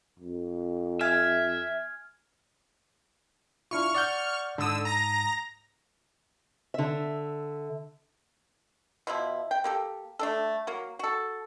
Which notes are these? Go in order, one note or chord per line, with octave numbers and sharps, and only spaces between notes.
F2
E5 G#5 F6 G#6
D4 E4 F4 C#6 F6
D5 F#5 G6
G#2 D3 A5 D#6 E6
A#5 A#6
D3 E5
B2 F3 E4
G5
A#3 G4 A4
A3 D4 A4
F#3 A#3
F#4 A4